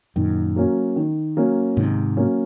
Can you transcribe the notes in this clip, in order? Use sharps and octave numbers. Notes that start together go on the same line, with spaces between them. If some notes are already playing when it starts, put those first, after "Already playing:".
F#2 A#2 D#3
F#3 A#3 C#4
D#3
F#3 A#3 C#4
G#2 C3 D#3
F#3 A#3 C#4